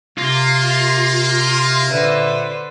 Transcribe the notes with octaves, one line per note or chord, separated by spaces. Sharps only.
C3 A#3 F4
A#2 D3 B4 C5 E5